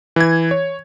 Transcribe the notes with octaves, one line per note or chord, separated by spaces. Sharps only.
E3 G#6
C#5